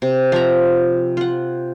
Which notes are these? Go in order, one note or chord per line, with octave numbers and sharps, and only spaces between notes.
C3
F3 E5 A#5
F4 F#5